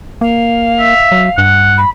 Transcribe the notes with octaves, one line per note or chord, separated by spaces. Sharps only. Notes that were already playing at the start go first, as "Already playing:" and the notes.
A#3 F5
E5
F#3
G2 F#5
B5